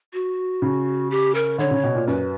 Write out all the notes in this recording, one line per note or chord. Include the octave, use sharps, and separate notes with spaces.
F#4
C#3
G4
A#4
D3 C#5
C#3
B2
A#2
F#2 B4